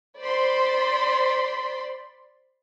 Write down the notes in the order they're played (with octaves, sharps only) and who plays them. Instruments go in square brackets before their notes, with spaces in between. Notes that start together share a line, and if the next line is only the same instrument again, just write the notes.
[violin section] C5 D5 B5 C6